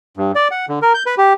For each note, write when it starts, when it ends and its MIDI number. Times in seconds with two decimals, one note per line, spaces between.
0.17 0.32 43
0.35 0.48 74
0.51 0.66 78
0.69 0.79 50
0.82 0.93 70
0.94 1.03 91
1.06 1.15 71
1.18 1.33 67